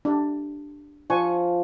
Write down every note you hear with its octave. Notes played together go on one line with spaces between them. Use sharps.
D4 G4
F3 D5 G#5 C#6